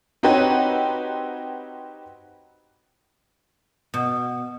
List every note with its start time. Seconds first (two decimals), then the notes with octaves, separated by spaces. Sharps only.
0.23 C4 D#4 F#4 G4 B4 C#5
3.94 B2